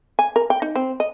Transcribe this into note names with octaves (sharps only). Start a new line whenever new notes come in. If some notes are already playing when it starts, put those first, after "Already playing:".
G#5
A#4
G5
D#4
C4
D#5